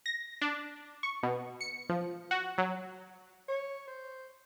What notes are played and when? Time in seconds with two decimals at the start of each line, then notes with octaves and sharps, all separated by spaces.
0.06 A#6
0.42 D4
1.03 C#6
1.23 B2
1.61 C#7
1.89 F3
2.31 F#4
2.58 F#3
3.48 C#5
3.87 C5